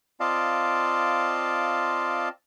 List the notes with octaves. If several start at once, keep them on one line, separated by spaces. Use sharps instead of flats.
C4 F4 D5 D#5 F5 A5